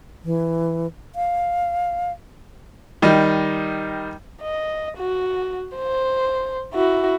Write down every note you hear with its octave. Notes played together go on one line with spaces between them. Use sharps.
E3
F5
D#3 G3 D#5
D#5
F#4
C5
E4 F#4